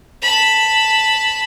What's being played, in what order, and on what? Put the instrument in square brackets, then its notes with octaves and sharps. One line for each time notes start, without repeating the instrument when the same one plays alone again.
[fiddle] A5 B5